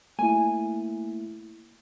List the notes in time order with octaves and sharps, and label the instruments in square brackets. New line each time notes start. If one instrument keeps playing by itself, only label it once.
[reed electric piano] A3 A#3 E4 [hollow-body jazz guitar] G#5